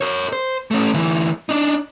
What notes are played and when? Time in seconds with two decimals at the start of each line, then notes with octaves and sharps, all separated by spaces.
0.01 A#4 C#5
0.33 C5
0.71 A3 C#4
0.94 D2 E3
1.49 D4 D#4